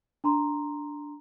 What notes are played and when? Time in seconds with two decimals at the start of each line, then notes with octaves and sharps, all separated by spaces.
0.24 D4 A#5 C6